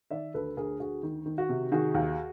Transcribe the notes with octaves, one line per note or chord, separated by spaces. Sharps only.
D#3 D5 E5
D2 A4 B4
D2 G#4 A#4
D2 F#4 G#4
D#3
D#3
F#4
C3
D#3 F#4 G#4
D#2